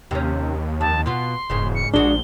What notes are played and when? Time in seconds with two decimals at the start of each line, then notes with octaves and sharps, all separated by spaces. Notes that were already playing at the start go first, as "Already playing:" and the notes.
0.11 D#2 C3 C#4
0.81 F2 A5
1.06 B2 F4 C6
1.50 E1 G#2 C#3
1.75 C#7
1.94 A#1 G#3 D4 F#4 G7